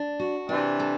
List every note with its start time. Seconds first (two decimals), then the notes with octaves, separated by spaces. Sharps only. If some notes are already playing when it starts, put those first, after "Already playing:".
Already playing: D4
0.19 F#4
0.49 C3 E3 D4
0.80 A4